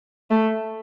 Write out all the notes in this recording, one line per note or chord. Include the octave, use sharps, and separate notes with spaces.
A3